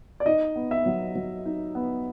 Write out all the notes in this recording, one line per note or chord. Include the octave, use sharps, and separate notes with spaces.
D5
D#4 D#5
B3
E5
F#3
F#3
D#4
B3